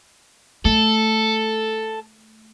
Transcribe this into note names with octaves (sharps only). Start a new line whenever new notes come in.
A3 A4